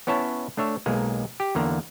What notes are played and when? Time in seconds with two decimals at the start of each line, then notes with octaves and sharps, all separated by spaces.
0.07 B3 C#4 E4 C#5 A5
0.57 A3 D4 C#5 E5
0.86 B1 G#3 A#3
1.40 G4
1.55 E2 D3 A#3 A#5